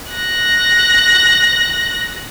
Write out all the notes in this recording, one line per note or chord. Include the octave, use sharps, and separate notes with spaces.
F#6 A#6